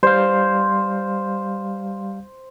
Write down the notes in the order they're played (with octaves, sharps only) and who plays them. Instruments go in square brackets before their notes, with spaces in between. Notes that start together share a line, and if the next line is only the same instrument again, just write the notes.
[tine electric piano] G3 F5 [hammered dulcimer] C5